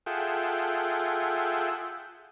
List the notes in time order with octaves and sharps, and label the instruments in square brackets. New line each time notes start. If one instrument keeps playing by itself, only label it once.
[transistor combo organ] F4 G#4 A4 E5 F#5 G5